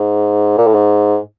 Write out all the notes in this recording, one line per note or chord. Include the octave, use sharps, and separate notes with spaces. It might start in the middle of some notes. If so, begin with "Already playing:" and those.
Already playing: G#2
A#2
A2
G#2